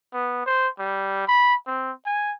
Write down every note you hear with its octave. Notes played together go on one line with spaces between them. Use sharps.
B3
C5
G3
B5
C4
G#5